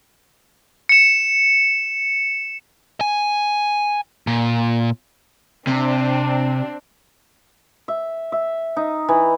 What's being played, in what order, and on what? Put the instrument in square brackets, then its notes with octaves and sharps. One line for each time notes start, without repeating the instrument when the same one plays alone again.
[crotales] C#7 E7
[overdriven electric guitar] G#5
A#2
[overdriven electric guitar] C3 [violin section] C4 D4
[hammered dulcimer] E5
E5
D#4
E3